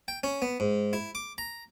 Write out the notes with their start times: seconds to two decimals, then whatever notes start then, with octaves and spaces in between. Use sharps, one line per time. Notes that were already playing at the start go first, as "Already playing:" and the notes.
0.08 G5
0.24 C#4
0.42 B3
0.60 G#2
0.93 E4
1.15 D6
1.38 A#5